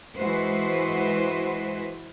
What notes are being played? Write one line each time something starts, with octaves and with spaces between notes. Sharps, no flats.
E3 G#3 F#4 B4 C5